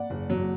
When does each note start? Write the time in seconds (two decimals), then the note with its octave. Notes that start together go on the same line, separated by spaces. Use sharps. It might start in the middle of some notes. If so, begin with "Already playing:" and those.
Already playing: D5 F#5
0.10 F#1
0.30 F#3